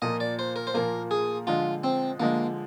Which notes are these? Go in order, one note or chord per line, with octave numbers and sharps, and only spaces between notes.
A#2 F3 A#3 D#5
D5
C5
A#4
C5
A#2 F3 A#3 A#4
G#4
D3 F3 G#3 F4
C4
D3 F3 G#3 A#3